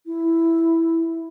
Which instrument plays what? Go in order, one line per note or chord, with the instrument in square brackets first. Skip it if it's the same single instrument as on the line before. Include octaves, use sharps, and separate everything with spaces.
[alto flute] E4